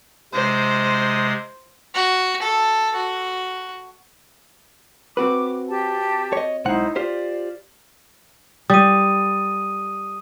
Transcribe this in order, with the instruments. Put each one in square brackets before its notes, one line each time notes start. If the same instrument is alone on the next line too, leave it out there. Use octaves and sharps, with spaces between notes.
[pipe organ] C3 G#3 D#6 [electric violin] C5
[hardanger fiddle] F#4
A4
F#4
[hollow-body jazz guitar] C4 F#4 B4 [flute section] D6
[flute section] G4 A5
[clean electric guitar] C#5 D#5
[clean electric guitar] B1 G#3 F#5 [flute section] D#4 E4 C5
[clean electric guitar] F4 G4 C5 [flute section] D5
[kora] G3 [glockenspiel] D#6 D#7